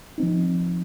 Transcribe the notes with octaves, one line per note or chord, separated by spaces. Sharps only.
F3 C4 D#4